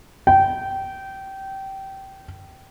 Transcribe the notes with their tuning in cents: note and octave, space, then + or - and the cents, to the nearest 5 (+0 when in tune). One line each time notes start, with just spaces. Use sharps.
G5 -20